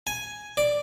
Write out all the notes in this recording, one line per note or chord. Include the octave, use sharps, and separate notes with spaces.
G#5
D5